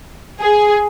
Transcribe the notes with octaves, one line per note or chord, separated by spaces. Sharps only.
G#4